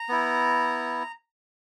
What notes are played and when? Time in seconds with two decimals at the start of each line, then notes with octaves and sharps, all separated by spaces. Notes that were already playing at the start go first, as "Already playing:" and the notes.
Already playing: A#5
0.09 B3 E4